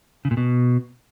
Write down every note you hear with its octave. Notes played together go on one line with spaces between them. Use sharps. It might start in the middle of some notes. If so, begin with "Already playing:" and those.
C#3
A#2
B2